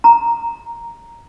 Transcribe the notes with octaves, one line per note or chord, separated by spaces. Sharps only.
A#5